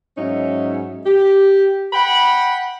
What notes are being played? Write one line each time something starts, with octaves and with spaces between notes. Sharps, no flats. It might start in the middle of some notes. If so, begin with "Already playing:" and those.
G#2 F#3 C#4 D#4 E5
G4
F#5 G5 B5